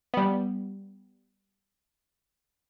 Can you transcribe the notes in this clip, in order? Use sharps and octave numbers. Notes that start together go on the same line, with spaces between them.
G3 B3